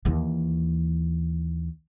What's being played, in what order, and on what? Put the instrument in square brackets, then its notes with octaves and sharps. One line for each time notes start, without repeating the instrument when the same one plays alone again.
[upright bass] D#2 E3